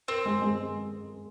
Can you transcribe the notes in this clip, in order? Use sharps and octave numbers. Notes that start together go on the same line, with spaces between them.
C4 A#4
G#3
G#3